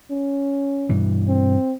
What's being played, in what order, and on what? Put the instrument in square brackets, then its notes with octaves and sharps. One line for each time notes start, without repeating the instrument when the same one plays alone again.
[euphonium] C#4
[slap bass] G2 B2 E3
[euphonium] C4